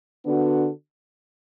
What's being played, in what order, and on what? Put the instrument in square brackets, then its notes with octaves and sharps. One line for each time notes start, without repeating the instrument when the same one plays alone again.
[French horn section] D3 B3 D4 F#4